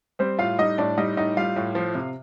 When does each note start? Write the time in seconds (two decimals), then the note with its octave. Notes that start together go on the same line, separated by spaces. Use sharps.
0.19 G3 C4 C5
0.39 A2 F4 F5
0.59 G3 D#4 D#5
0.78 A2 D4 D5
0.97 G3 D#4 D#5
1.17 A2 D#4 D#5
1.37 G3 F4 F5
1.56 A2
1.75 F3
1.95 C3